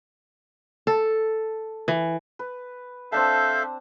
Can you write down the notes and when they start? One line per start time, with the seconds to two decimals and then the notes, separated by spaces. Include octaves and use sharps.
0.87 A4
1.88 E3
2.39 B4
3.12 C4 D4 A4 E5 F5 A5 G6